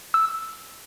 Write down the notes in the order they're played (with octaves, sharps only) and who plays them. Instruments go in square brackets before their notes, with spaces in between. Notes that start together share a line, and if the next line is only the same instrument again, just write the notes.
[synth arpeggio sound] E6